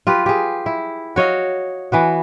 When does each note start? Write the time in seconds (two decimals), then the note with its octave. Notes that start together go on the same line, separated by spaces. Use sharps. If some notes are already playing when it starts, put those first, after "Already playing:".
0.07 F4 G4 B4
0.26 G4 G#4
0.66 E4
1.16 F#4 C#5 D#5 F5
1.92 E3 B3 F#4